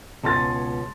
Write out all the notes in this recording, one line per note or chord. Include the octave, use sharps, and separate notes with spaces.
C#2 B2 C#4 A5 C6 A6